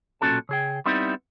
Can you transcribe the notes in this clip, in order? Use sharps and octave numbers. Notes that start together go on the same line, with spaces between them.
B1 A#2 C#4 F#4 A4 A5
C#3 G#4 G5
G3 B3 C4 D#4 E4